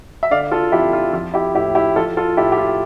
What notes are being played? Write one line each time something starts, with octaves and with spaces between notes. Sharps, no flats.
E5
D3 D5 F5
F4 A4
F2 E4 G4
F4
F3 F4
E4 G4
A2 E4 G4
E4 G4
F3 F4 A4
F4 A4
A2 E4 G4
G4
F4